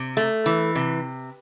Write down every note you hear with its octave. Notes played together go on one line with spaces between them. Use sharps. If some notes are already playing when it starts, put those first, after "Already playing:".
Already playing: C3
A3
E3
C3